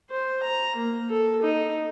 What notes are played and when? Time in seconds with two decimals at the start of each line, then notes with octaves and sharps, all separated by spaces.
0.10 C5
0.43 A#5
0.76 A#3
1.09 A4
1.42 D#4